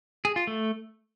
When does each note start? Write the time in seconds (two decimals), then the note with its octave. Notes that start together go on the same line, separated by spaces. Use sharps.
0.25 G#4
0.36 F4
0.47 A3